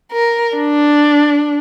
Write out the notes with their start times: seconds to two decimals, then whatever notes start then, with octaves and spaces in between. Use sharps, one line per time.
0.12 A#4
0.57 D4